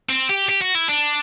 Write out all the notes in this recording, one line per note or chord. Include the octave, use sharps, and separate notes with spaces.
C4
G4
G4
F#4
E4
D4